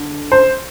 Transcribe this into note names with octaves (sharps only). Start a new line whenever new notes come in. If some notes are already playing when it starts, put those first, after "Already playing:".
Already playing: D3
C5